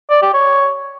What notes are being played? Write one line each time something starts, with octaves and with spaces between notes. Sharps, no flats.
D5
G4
C#5